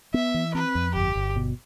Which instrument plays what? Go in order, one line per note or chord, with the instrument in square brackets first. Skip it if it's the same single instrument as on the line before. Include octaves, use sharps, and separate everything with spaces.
[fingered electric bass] B3 [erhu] E5
[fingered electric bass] E3
[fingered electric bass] C4 [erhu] B4
[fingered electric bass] F2
[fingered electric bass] G1 [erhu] G4
[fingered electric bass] G1
B2